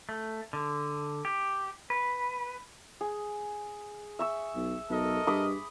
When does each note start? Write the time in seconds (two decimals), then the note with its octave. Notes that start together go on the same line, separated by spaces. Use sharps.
0.09 A3
0.53 D3
1.25 G4
1.90 B4
3.01 G#4
4.19 E5 C#6 E6
4.56 B1
4.90 B1 A4 A#4 D#5
5.27 G2 B5 D6 D#6